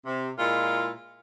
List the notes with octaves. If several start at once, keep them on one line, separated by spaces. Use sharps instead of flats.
C3
A#2 G#3 E4 F4